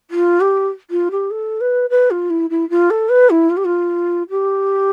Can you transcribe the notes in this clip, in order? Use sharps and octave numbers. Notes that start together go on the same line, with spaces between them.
F4
G4
F4
G4
A4
B4
B4
F4
E4
E4
F4
A4
B4
E4
F4
G4
F4
G4